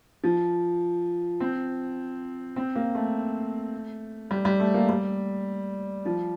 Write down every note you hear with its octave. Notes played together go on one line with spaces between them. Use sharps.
F3
C4
C4
A#3
A3
G3
G3
A3
A#3
G3
F3